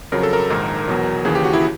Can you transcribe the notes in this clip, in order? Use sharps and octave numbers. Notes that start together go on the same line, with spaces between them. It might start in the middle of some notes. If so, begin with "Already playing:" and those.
F2 C#3 F#3 A#4
A4
A#4
A#1 G#2 D#3
E2 B2 F#3
D#2 C#3 E3 G#4
G4
F#4
E4